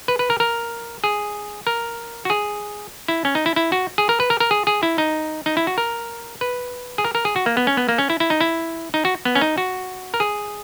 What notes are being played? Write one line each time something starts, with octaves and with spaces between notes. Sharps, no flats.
B4
B4
A#4
A#4
G#4
A#4
F#4
G#4
E4
C#4
D#4
E4
E4
F#4
G#4
A#4
B4
A#4
A#4
G#4
G#4
E4
D#4
D#4
E4
F#4
A#4
B4
G#4
A#4
A#4
G#4
F#4
A#3
B3
C#4
B3
A#3
C#4
E4
E4
D#4
E4
D#4
F#4
B3
C#4
D#4
F#4
A#4
G#4